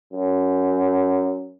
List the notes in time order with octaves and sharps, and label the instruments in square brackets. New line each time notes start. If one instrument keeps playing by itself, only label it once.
[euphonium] F#2